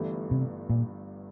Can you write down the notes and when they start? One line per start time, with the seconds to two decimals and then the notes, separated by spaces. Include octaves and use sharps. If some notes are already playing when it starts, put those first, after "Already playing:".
Already playing: G1 G2 E3 A3
0.31 C3
0.69 A#2